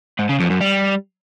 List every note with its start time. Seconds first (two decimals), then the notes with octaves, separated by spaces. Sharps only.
0.19 G#2
0.29 C#3
0.40 F2
0.50 F#2
0.61 G3